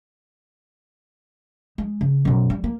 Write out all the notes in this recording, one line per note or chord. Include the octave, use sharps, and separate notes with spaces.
G#3
C#3
F#2 B2
G3
A#3